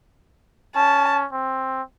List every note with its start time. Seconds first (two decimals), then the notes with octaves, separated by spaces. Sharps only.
0.75 C#4 A5
1.32 C4